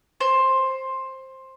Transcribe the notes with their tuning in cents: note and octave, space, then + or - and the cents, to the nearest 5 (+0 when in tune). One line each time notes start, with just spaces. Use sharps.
C5 +10